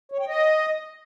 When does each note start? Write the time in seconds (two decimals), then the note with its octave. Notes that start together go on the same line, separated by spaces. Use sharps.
0.12 C#5
0.20 G5
0.28 D#5